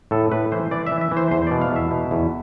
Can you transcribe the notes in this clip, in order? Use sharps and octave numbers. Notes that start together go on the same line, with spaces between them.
A2 A4
A2 B4
E3 C5
E3 D5
E5
E3
E5
E3
C5
E2 C5
B2 D5
F5
E2
E5
B2
E2